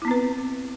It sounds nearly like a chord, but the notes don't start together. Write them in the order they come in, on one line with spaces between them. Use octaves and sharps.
E4 B3 C4 B4